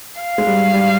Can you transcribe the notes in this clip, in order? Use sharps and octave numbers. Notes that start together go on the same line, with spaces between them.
F5
G#3
G3
G3